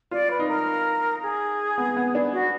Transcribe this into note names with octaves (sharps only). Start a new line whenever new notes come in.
F4 D5
B4
D#4
A#4
G#4
B3
B3
D4
F#4